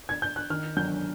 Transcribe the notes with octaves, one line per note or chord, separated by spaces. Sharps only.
G#6
G6
F#6
D#3 F6
F#3 G6